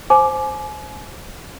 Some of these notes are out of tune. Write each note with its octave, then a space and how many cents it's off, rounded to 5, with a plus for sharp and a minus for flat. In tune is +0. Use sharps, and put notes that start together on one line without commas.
C5 +0 G#5 +35 D6 +5